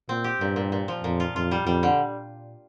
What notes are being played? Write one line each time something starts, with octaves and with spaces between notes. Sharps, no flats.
A#2 C4
G4
G2 A#2
A#2
A#2
F3
F2 A#2
F4
F2 F4
G3
F2 G3
D3